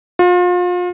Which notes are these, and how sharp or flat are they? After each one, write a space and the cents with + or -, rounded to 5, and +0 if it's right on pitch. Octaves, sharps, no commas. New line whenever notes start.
F4 +35